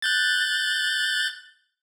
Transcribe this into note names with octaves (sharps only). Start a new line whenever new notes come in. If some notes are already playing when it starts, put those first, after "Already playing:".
F#6 G6 A6